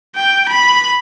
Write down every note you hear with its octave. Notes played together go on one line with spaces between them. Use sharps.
G5
B5